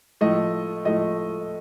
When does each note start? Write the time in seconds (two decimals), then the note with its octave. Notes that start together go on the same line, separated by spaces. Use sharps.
0.21 A2 F3 A3 D#5
0.85 A2 F3 A3 D#5